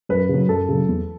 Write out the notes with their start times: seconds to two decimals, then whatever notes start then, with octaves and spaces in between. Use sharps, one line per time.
0.09 F#2 B4
0.29 C#3
0.34 F#3
0.48 F#2 A4
0.69 C#3 F#3
0.89 E2